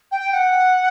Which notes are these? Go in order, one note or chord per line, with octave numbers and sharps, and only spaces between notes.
G5
G5
F#5